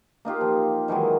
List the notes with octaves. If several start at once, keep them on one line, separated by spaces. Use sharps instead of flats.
A#3 D#4 F4 G4
F3
D#3 E3 F#3 G#3